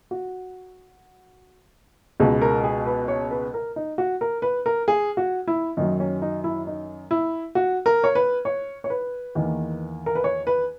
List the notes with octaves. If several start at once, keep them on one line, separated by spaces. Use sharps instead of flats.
F#4
C#2 B2 G#3
A#4
G#4
B4
C#5
B4
A#4
D#4
F#4
A#4
B4
A#4
G#4
F#4
E4
F#2 D#3 F#3 D#4
C#4
D#4
E4
D#4
E4
F#4
A#4
C#5
B4
C#5
C#5
B4
E2 D#3 A#3
A#4
B4
C#5
B4